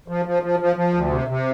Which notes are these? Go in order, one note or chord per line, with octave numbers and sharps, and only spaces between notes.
F3
F3
F3
F3
F3
D2
C3
C3